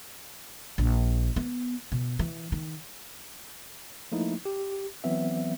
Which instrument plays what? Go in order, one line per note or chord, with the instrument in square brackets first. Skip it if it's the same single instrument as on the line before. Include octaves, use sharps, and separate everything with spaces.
[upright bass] A#1
B3
B2
E3
D#3
[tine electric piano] F3 A3 A#3 D#4 E4
G4
E3 F#3 B3 C4 E5